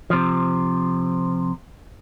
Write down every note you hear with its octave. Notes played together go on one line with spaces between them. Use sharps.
C3 F3